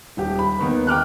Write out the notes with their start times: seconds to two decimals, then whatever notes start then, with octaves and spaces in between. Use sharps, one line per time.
0.17 D#1 G4
0.39 B5
0.59 D#2 D#3 B3 B4
0.87 G5 D6 F6 F#6